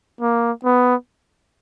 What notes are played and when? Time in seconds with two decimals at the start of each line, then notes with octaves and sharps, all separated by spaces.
0.21 A#3
0.64 B3